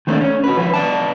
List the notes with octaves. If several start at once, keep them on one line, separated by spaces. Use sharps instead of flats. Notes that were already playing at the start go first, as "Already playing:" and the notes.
D#3 A3 C4 D4
C#4
F#4 B4
F3 B4
B3 D5 A5